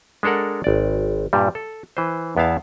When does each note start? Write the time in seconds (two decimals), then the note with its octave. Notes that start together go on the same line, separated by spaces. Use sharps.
0.23 G#3 D4 A4 A#4 F#5
0.64 G#1 D5
1.33 G2 A#2 G3
1.55 A4
1.97 E3 B4 C5
2.37 E2 B3 E4 F5 A5